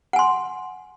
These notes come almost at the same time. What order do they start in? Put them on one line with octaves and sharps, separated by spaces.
F#5 G#5 C6